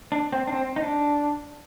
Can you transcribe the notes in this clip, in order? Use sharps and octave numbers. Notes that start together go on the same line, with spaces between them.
D4
C4
D4
C4
D#4
D4